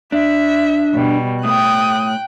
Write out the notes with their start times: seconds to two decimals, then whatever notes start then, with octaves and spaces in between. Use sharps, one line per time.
0.12 D4 E5
0.93 B2 G3
1.44 A2 G5 D#6 F#6